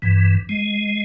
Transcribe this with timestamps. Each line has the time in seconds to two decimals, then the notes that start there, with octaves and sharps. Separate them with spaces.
0.02 G2 E3
0.49 G#3